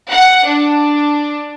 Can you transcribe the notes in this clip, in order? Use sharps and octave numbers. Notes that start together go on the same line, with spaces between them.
F#5
D4